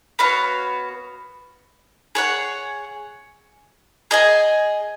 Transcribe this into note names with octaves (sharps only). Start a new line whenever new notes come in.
B3 F#4 C#5 F5
G#4 C#5 F#5
G#4 D#5 G#5